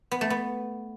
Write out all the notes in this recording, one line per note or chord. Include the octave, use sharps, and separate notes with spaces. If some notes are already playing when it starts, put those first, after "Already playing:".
B3
A3
B3